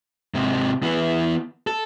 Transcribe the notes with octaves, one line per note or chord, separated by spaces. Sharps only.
G#2 C3
E3 B3
A4